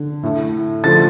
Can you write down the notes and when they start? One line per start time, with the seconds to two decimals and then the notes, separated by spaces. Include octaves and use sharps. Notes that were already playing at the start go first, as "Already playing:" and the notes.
Already playing: D3
0.23 A2 A3
0.84 D3 F3 A3 A6